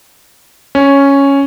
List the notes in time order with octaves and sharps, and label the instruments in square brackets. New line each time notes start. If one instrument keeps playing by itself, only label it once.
[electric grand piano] C#4